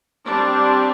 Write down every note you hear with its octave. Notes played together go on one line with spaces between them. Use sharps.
G3 C4 D4